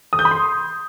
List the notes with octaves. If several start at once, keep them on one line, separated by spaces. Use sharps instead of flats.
D#6
G6
B5
C6